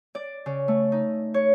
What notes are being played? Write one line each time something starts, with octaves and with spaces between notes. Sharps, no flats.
D5
C#3
A3
D#4
C#5